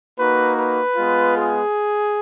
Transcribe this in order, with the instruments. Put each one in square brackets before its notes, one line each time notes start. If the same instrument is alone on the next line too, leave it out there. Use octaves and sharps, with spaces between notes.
[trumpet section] A#3 D#4 F#4 B4
B4
G#3 B3 F4
G#4